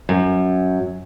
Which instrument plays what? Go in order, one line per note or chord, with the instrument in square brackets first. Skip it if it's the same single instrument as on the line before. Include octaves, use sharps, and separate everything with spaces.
[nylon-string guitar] F#2